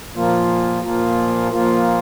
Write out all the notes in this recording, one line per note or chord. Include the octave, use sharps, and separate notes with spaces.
A#2 F3 A#3 F4
A#2 F3 A#3 F4
A#2 F3 A#3 F4